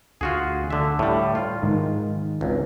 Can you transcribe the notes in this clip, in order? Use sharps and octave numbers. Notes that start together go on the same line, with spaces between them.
D2 F4 F#4 G#4
D3 E5
A2 G3
F4
G#2 D#3 G#3
G#1 C#2